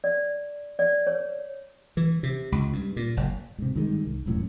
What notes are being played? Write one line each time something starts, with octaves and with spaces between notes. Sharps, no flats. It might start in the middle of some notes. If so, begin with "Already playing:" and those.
D5
D5
C#5
E3
C3
C#2
G2
A#2
F#1
G#2 C3
G2 D#3 G#3
C2
E1 F#2 A2